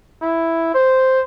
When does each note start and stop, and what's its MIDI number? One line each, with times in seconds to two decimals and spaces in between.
0.22 0.74 64
0.75 1.22 72